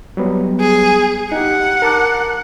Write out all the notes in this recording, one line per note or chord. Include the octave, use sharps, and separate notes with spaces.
F#3 G3 B3
G#4
D#4 G4 F#5
A#4 A5 D6